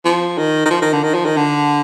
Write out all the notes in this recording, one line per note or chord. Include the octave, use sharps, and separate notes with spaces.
F3
D#3
D#3
F3
D#3
D3
D#3
F3
D#3
D3